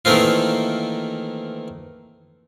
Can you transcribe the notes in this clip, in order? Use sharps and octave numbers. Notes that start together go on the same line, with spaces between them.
D#3 E3 A3 A#3 C4 F4